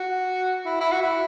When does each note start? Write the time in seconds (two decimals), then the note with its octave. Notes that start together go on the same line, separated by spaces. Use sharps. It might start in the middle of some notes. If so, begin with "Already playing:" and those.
Already playing: F#4
0.65 E4
0.80 E4
0.91 F#4
1.02 E4